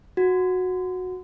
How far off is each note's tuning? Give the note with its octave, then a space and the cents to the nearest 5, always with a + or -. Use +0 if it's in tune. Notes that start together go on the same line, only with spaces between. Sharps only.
F#4 -10